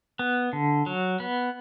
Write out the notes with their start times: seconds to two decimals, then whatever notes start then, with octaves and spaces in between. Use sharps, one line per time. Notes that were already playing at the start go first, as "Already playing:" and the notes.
0.19 B3
0.53 D3
0.86 F#3
1.20 B3